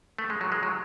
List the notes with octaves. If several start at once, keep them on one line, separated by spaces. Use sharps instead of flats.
A3
G#3
F#3
G#3
F#3